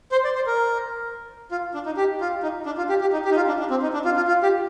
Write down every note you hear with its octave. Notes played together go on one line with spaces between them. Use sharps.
C5
D5
C5
A#4
F4
D4
D#4
G4
F4
D#4
D4
F4
G4
G4
D#4
G4
D#4
F4
D4
D4
C4
D#4
D4
F4
F4
F4
G4